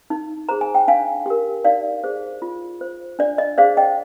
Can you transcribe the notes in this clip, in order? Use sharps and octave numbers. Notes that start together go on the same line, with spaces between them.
D#4
G#4 C5 A#5
G#5
G5
D4 F5 G#5
G4 A#4
D#4 D5 F5
G#4 C5
F4
C5
D4 D5
D#5
G#4 C5 D5 F5
D#5 G5